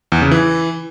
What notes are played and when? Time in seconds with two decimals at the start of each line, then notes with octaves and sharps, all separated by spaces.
0.12 E2
0.22 C#3
0.31 E3